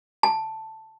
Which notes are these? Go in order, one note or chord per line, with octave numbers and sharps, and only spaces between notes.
A5